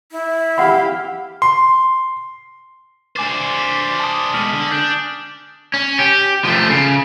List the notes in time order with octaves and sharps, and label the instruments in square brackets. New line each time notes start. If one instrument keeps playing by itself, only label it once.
[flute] E4
[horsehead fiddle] G4 F5 [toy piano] F#5 B5
[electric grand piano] C6
[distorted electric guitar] D4 C5 [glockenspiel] G#5 D6 A6
[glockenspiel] D6 A6 B6
A5 D#6
[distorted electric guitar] B2 G#3 [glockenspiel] F6 B6 F#7
[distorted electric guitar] D3
[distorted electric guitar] D4 [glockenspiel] G6
[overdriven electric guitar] C#4
G4
F3 A3
C#3